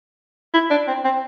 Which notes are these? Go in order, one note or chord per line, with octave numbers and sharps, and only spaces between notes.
E4
D4
C4
C4